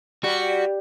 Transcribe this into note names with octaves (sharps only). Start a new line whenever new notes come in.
G3 F#4